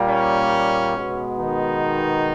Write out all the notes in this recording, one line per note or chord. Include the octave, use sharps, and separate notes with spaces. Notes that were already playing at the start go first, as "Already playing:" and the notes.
Already playing: A#2 G3 A#3
C#4
B2 G#3 B3
D#3 D#4